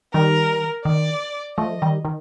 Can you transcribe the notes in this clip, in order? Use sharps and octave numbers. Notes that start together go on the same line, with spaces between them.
D#3 G3 A#4
D#3 D5
F3 A3 D#5
D#3 G3
D#3